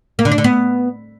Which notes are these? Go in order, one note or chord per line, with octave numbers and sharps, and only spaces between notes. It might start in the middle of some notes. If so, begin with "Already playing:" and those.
A#3
D3
D4
D3
B3